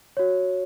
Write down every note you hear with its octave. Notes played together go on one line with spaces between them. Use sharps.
F#4 C#5